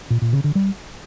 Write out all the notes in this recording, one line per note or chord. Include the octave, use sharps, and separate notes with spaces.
A#2
A#2
C#3
D3
G3